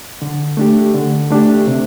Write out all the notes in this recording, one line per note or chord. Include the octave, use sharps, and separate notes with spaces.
D3
A3 D4 G4
D3
A3 D4 G4
C3